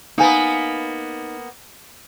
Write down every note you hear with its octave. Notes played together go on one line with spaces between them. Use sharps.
A#3 B3 D#4 G#5